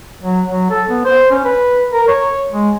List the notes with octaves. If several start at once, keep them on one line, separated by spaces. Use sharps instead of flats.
F#3
F#3
A4
B3
C5
C#4
B4
A#4
C#5
G#3